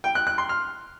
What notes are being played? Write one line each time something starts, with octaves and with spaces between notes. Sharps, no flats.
G5
F#6
F#6
C6
F6